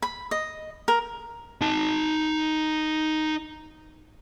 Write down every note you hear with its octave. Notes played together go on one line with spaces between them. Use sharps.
B5
D#5
A#4
D#4 A5